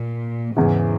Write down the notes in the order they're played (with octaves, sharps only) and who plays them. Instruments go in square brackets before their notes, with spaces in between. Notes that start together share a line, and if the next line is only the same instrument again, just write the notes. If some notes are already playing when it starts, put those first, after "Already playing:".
Already playing: [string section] A#2
[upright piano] E2 C#3 E3 [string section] G#2